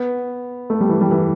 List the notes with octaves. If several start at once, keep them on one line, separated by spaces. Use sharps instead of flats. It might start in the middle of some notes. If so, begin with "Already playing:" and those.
Already playing: B3
A3
G3
E3
G3
E3